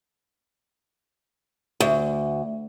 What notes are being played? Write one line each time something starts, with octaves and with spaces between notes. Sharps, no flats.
D2